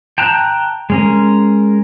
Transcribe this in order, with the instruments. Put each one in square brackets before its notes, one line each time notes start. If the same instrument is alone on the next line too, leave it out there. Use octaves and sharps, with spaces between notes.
[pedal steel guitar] G5 A5 A#5 F#6
G#3 C#4 A#4